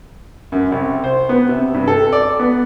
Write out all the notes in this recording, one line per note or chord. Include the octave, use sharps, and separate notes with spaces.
F#2
C2
C5
B3
C3
G2
A4
D5
B3